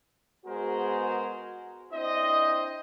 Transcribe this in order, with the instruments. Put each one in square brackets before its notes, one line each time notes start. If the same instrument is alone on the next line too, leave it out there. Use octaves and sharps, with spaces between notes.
[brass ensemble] G#3 B3 F#4 G#4 A#4 C5
C4 D4 E4 C5 D#5